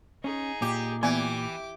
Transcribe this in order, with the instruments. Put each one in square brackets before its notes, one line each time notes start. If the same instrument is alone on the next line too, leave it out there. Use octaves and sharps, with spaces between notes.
[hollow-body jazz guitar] C#4 [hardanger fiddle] D#4 G#4
[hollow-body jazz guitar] A#2 [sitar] G4
[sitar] E3 [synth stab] B3 D5 G#5 [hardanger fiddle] G4 D6